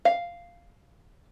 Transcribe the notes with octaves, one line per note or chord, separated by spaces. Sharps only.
F5